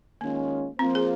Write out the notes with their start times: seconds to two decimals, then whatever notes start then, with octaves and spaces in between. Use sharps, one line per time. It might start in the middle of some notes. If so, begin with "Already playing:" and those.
0.21 D#3 G#3 A#3 C#4 F4
0.79 F3 A#3 C4 F4 C5
0.95 G#4